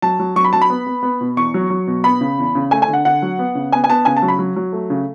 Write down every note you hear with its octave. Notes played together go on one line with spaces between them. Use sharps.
F#3 A5
F#3
F#3 C#6
B5
F#3 A5
B5
B3
B3
B3
B2
E2 C#6
F#3
F#3
B2
B3 B5
C#3
E2
C#3
A3 G#5
G#5
D3
F#5
D3 F#5
F#3
B3
C#3
B3 G#5
G#5
B3 A5
C#3 G#5
A5
F#3
B5
F#3
F#3
A3
C#3